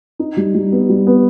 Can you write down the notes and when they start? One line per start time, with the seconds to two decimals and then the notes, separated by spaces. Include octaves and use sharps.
0.19 D#4
0.37 G3
0.54 G3
0.72 B3
0.89 G3
1.07 B3